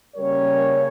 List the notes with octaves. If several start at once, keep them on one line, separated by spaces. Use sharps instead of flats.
C#3 G3 A#3 C#4 A#4 C#5